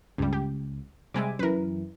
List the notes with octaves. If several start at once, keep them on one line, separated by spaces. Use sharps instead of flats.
C#2 G2 G3
G4
C3 G3 G#3 E5 G#5 D6
F#2 E3 A#4 B4